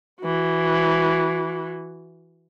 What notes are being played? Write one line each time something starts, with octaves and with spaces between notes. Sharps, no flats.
E3 F#4